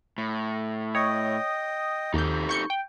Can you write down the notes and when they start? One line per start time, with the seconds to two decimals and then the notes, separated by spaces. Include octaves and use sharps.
0.18 A2
0.95 C#5 D#5 G5 D#6
2.14 D#2 D#4 G4 A4 G6
2.49 C#6 G6 C#7
2.70 G5